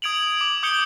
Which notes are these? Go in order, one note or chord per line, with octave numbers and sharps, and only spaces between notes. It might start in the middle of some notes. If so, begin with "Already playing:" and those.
D#6 G#6 D7 F7 F#7
F7
D6
D6 D#6 G6 C#7 G7